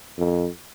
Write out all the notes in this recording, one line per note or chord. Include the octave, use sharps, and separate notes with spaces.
F2